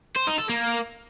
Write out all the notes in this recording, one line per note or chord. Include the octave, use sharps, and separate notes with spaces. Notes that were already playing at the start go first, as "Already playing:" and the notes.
C5
D#4
A4
A#3